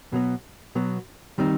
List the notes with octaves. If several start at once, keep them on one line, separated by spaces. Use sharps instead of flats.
B2 F#3 B3
B2 F#3 B3
D#3 G3 C4 D#4